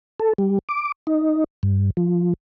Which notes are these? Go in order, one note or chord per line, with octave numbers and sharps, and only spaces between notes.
A4
G3
D6
D#4
G2
F3